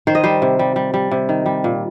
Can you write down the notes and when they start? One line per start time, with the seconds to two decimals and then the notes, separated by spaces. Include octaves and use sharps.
0.07 D#3 C5
0.15 D#5
0.24 G3 C5
0.42 C3
0.59 G3
0.76 G3
0.94 G3
1.11 C3
1.29 D#3
1.46 G3
1.64 A#2